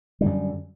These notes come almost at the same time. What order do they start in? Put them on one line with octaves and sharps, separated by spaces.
G3 D3 F#2